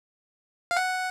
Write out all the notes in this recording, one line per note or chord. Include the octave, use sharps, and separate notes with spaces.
F5
F#5